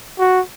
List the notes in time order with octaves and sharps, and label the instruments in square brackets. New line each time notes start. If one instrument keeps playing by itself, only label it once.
[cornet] F#4